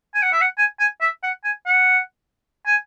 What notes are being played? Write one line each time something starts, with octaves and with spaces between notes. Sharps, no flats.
G#5
F#5
E5
F#5
G#5
G#5
E5
F#5
G#5
F#5
G#5